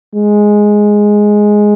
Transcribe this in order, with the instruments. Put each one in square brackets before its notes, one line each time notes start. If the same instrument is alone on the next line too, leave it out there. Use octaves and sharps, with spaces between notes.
[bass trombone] G#3